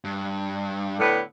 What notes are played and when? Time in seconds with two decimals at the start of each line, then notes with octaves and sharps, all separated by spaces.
0.04 G2
0.99 A2 D3 B3